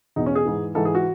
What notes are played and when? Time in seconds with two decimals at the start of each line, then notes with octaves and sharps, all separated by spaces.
0.16 E2 B2 D#4
0.26 C#4
0.35 G#4
0.45 G#2 E3
0.75 G#2 E3 A4
0.85 G#4
0.95 F#4